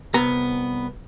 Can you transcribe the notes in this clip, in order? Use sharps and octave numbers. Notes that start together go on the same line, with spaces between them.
C2 B3 A#5